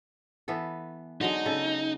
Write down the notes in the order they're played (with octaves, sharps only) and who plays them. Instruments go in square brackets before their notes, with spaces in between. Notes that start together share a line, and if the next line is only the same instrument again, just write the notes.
[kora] E3 B3 A4
[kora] D3 F#3 G#3 [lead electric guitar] D#4
[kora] C#3 A4